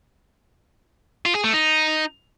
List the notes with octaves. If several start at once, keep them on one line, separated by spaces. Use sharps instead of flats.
F4
G#4
A3
D#4